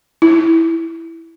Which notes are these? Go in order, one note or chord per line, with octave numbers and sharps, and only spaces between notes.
E4